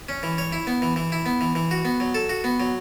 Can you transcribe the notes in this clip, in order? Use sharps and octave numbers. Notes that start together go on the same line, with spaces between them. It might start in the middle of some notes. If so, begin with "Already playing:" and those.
C#4
E3
C#5
E4
B3
E3
E3
E4
B3
E3
E3
F#4
B3
F#3
A4
F#4
B3
F#3